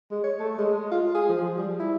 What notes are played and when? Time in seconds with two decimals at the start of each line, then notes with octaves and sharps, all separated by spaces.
0.11 G#3
0.24 C#5
0.40 A3
0.58 G#3
0.92 F4
1.15 G#4
1.29 F3
1.43 F3
1.57 G3
1.80 E4